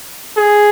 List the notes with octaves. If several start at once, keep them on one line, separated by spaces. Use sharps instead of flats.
G#4